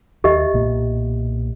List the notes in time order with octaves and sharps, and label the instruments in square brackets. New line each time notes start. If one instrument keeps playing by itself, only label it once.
[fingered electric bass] D#2 [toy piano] G4 D#5 E5
[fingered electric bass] B1 A#2 A#3